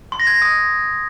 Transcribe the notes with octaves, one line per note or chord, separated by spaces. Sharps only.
C6
A#6
G#6
A#6
D#6